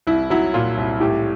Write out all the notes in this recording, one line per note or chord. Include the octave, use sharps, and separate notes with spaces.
C2 E4
F#3 E4
A#2 F4
C2
A2 G4